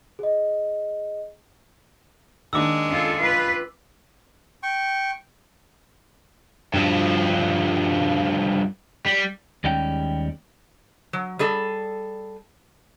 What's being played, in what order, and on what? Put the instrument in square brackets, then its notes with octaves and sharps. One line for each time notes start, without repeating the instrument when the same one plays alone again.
[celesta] G#4 D#5
[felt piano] D#3 A#3 D4 [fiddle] G#3 [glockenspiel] D6 E6
[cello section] C#4 F4 A4
F4 B4
[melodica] G5 C#6
[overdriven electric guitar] G2 F3
G3
[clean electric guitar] D#2 G3 G#3 C#4 G5
[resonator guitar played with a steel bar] F#3
G3 G#4 A4